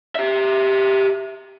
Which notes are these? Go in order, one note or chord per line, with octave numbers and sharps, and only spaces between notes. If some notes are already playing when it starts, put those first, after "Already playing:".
G4 E5